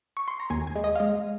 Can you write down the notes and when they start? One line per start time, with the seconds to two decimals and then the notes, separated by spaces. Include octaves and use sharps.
0.17 C#6
0.28 C6
0.40 A#5
0.50 D#2 G#5
0.67 G#5
0.76 G#3
0.84 D#5
0.96 F5
1.00 G#3 D#5